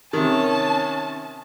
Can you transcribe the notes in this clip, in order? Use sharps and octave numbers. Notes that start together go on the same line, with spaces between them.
C3 D#3 C#4 A5